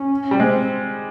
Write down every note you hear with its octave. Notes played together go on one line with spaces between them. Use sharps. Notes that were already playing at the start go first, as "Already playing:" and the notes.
Already playing: C#4
G3
G#3 C4